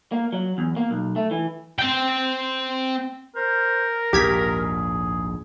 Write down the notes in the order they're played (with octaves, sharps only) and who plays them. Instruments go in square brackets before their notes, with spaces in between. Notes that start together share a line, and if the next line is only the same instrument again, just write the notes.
[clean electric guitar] A#3
F#3
E2
A#3
B1
A3
E3
[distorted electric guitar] C4 G5
[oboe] A#4 [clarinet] C5
[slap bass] A#1 D#2 G#2 [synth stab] G4 G#6 B6 [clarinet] G#4